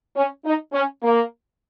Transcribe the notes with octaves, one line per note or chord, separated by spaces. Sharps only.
C#4
D#4
C#4
A#3